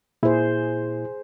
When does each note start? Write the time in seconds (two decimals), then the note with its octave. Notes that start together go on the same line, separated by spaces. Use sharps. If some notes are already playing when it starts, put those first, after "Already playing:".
0.23 A#2 E4 G#4 C5